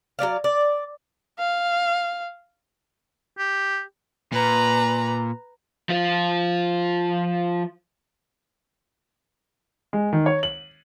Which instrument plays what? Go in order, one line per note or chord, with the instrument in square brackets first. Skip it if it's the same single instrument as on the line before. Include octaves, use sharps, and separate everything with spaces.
[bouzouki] F#3 C4 D5 F5
D5
[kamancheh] F5
[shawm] G4
[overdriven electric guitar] A#2 [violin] B4 A#5
[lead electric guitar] F3 F4
[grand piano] G#3
D#3
C#5
F#7